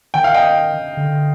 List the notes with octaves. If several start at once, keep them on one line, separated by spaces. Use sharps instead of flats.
D#3 G5
F5
D#5 G5
D3